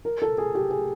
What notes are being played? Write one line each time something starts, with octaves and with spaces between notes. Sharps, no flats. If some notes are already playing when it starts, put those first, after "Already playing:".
A#4
A4
G#4
G4
G#4